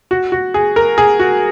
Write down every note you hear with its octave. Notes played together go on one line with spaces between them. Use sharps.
F#4
F#4
G#4
A#4
G#4
F#4